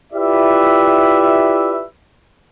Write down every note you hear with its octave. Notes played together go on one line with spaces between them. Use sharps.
E4 F4 G4 B4 D5 E5